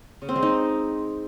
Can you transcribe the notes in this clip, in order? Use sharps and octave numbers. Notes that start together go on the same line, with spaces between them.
C#3
C4
G#3
D#4